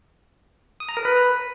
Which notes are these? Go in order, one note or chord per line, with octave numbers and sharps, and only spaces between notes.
D#6
A#5
A#4
B4